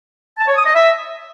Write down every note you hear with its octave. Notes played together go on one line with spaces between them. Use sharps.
A5
C#5
D#6
D#5
E5